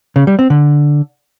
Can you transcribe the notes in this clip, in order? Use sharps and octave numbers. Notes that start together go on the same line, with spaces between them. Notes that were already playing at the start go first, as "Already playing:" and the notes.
C#3
G3
C4
D3